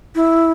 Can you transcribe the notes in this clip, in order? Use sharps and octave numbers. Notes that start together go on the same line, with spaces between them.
E4